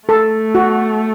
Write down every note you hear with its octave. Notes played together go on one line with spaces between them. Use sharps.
A3 A4
F#4